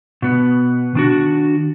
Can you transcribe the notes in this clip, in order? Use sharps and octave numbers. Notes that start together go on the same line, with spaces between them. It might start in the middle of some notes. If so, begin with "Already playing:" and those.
B2 B3
D#3 D4 F#4